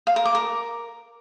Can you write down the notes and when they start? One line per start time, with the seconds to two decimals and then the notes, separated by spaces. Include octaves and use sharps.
0.07 F5
0.16 A#4
0.25 D6
0.35 A#4